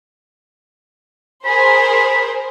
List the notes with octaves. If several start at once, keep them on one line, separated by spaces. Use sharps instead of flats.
G#4 A#4 C5 B5